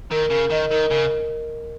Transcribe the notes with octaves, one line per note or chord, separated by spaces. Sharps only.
D#3 A#4
C#3 A#4
D#3 D#5
D#3 A#4
C#3 A#4